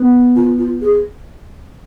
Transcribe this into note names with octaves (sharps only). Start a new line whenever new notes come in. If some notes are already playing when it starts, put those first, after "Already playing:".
Already playing: B3
F4
F4
G#4